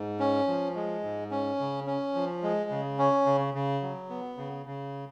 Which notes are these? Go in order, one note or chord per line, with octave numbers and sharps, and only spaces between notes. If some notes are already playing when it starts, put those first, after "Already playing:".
Already playing: G#2
C#4
F3
G#3
G#2
C#4
C#3
C#4
F3
G#3
C#3
C#4
C#3
C#3
F#3
B3
C#3
C#3